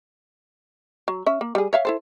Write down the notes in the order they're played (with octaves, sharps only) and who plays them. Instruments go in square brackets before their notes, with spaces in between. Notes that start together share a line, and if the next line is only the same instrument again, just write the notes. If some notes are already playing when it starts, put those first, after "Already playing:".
[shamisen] F#3
C#4 E5
A#3
G3 G#4
C#5 E5 F5
E4 A4 C5